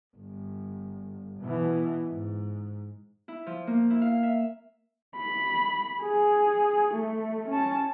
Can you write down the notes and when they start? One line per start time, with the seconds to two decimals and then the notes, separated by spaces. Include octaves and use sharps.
0.16 G1
1.40 B2 E3
2.08 G#2
3.28 E4
3.46 F3
3.67 A#3
3.90 E4
4.02 F5
4.23 E5
5.16 B5
6.03 G#4
6.94 A3
7.49 C#4 A5